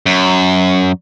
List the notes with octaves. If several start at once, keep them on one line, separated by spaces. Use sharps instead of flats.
F#2